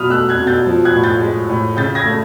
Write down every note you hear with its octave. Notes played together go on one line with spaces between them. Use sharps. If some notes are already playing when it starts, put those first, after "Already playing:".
Already playing: B2 F#3 B5 D#6 F6
A3 E6 F#6
F#6 G#6
B2
G6 A6
F3
F#6 G#6
A2
G6 A6
G#3
A2
C#3 G6 A6
G#6 A#6
A3